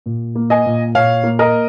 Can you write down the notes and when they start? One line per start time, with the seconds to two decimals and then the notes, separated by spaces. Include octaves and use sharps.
0.06 A#2
0.35 A#3
0.50 D#5 G#5
0.66 A#2
0.95 A#2 C#5 F5
1.24 A#3
1.39 A#4 D#5